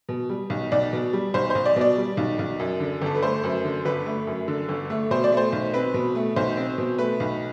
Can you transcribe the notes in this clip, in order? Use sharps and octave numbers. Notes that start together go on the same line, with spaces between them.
B2
G3
B1
B1 D5
B2
G3
B1 C5
B1 C5
D5
B2 D5
G3
B1
B1
F#2
D3
G1 A4
B4
A3 C5
F#2
D3
G1 B4
A3
F#2
D3
G1
A3
B2 C5
D5
A3
C5
B1
C4 B4
B2
A3
B1 C5
C4
B2
A3 B4
B1